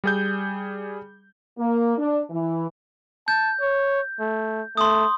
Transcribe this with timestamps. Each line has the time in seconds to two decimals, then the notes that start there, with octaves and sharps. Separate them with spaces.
0.04 G3 G#4 G6
1.58 A#3
1.98 D4
2.31 E3
3.28 A5 G6
3.61 C#5
4.20 A3
4.77 A3 C6 D#6